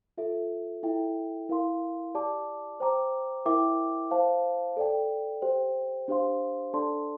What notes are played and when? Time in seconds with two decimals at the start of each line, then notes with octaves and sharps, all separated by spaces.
0.18 F4 A4 E5
0.83 E4 A4 E5 G5
1.49 E4 A#4 F5 C6
2.15 G4 D5 A5 D6
2.80 C5 G5 A#5 D6
3.46 E4 A#4 E5 G5 D6
4.11 C5 F5 A5
4.77 A4 D5 G5
5.42 G4 C5 G5
6.08 D4 G4 C5 F5 C6
6.73 D4 A4 D5 A5 C6